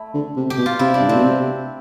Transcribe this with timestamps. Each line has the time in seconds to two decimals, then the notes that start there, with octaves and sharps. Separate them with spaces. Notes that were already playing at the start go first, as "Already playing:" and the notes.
Already playing: A3 E4
0.14 D3
0.36 C3
0.50 G4
0.58 B2
0.66 F4
0.79 C3 E4
0.94 D4
1.00 G2
1.08 A2 C4
1.15 B2
1.23 C3